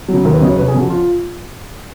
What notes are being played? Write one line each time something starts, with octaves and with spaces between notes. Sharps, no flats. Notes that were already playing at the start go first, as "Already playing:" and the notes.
C#3 F#3
D#2 A#4
B4
C#3 F#3 D#5
C#5
F1 B4
G#4
F2 C#3 F#4
F4